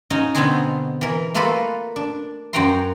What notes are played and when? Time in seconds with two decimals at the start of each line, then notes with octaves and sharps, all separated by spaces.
0.10 C#4 D#4 F#4 D#5
0.35 B2 D3 B3 C4 F#4 G#4
1.01 E3 A#4
1.34 A3 A#3 F4 F#4 A4 B4
1.96 D4
2.53 F#2 F#4 F#5 G5 A#5 C6